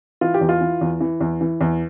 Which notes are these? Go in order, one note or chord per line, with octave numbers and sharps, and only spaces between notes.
E3 F4
G4
E2
F4
E3
E2
E3
E2
E3
E2